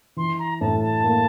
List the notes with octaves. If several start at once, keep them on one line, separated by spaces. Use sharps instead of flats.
E3 C6
A#5
A2 A5
A5
A#3